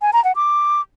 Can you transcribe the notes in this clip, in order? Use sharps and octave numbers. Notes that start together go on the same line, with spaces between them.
G#5
A#5
F#5
D6